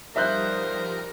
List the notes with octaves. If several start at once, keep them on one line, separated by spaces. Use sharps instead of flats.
F3 G3 D#4 A#4 C5 E5 F#6 G6